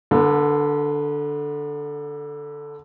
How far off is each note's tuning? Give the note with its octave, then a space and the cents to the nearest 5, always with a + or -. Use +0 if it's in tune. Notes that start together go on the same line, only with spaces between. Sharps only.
D3 +0 B3 -40